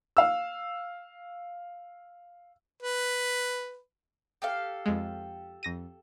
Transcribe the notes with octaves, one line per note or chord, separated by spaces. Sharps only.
F5 E6
B4
G4 A4 F5
F2 G#3
F2 A#6 D#7